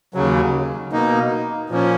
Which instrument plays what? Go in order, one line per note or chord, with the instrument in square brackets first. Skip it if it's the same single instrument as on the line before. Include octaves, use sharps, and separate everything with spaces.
[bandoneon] D#2 C#3 F#3
B2 A#3 D#4
A#2 F3 A#3 C#4